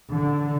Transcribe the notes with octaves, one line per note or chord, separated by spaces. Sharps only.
D3